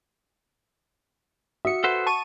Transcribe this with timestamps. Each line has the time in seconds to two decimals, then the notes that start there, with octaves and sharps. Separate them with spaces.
1.65 F#4 E5 D#6 C#7
1.84 A4 B4 C5 F#5
2.06 A5 C#6 D#7